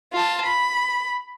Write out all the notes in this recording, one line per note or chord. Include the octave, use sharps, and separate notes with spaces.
F4 A5
B5